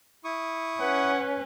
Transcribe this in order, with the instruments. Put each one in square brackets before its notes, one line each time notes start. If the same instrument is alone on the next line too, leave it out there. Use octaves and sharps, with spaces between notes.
[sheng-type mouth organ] E4 C#6 D#6
[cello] C#4 [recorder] B4 [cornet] F#5